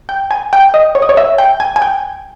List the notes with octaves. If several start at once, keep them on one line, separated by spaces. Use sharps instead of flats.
G5
G#5
G5
D#5
C#5
D#5
C#5
E5
G5
G#5
G#5
G5